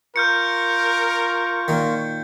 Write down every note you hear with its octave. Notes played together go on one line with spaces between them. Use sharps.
F4 A#4 C#6 F6 G6 C#7
A#2 D#3